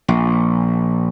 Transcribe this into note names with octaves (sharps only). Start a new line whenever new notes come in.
A#1